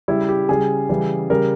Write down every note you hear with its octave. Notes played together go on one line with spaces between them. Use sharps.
C#3 G3 E4
G4
C#3 G3 G#4
C#3 E3 G3
C#3 G3 A#4